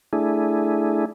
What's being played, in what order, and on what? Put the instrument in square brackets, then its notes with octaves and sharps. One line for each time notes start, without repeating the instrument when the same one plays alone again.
[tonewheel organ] A3 D4 E4 G#4